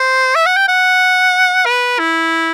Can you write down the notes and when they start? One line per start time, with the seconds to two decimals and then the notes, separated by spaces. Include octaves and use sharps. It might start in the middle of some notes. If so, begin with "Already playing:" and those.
Already playing: C5
0.35 E5
0.46 F#5
0.57 G5
0.68 F#5
1.65 B4
1.99 E4